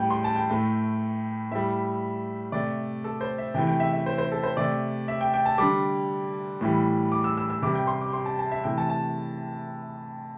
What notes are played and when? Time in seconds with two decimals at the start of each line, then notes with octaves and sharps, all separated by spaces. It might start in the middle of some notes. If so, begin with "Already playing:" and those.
Already playing: A2 G3 G5
0.10 C6
0.24 A5
0.36 G5
0.50 A2 A3
1.51 A2 G3 E5
2.52 C3 A3 D5
3.04 A4
3.21 C5
3.38 E5
3.54 C3 E3 A3 G5
3.67 G5
3.80 E5
3.93 E5
4.06 C5
4.18 C5
4.32 A4
4.43 C5
4.57 C3 A3 D5
5.08 E5
5.21 G5
5.34 G5
5.46 A5
5.58 D3 G3 D6
6.61 A2 E3 G3
7.12 D6
7.24 E6
7.37 E6
7.50 E6
7.62 C3 G3 D6
7.75 G5
7.87 C6
8.01 D6
8.13 C6
8.26 A5
8.39 A5
8.52 E5
8.64 C3 E3 A3 G5
8.78 A5
8.89 A5